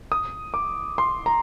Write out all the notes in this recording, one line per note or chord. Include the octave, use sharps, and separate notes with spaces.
D#6
D6
C6
A#5